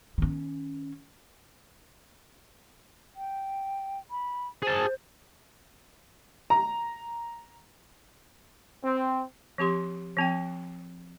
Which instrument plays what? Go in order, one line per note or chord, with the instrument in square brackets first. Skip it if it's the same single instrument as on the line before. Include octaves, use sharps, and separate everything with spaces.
[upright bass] D#3 C#4
[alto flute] G5
B5
[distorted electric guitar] G#4 A5 [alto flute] C5
[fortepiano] A#5
[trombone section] C4
[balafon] F3 C4 G4 C6
F3 C4 G5